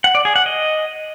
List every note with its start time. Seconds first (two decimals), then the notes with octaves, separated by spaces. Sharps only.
0.04 F#5
0.15 D5
0.25 G#4
0.36 F#5
0.46 D#5